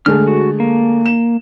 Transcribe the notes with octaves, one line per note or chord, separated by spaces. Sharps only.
D3 G#3 A3 F6
F#4
A#3
E7